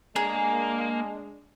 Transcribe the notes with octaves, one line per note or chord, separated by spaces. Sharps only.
G#3 A#3 D4 G#4 A#5